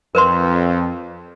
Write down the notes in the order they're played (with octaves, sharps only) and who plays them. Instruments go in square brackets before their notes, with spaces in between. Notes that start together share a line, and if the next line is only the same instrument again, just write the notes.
[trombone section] F2 [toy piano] A#4 B4 C6